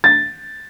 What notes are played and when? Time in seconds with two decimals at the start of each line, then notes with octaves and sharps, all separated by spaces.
0.04 A6